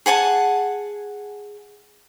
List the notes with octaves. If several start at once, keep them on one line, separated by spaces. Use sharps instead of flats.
G#4 F#5 G#5 A5